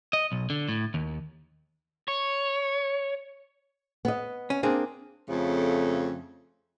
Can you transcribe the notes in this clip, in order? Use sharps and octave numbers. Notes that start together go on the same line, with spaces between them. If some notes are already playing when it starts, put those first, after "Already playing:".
D#5
B1
D3
A2
D#2
C#5
B3 D#5
C#4
A#3 C4 D4 G#4
F2 C#3 A3